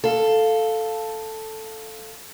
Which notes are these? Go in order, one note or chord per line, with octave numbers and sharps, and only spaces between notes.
A4 F5